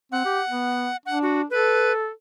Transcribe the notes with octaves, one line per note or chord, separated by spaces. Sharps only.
C4 F#5
G4
B3
D4 F#5
F#4
A4 B4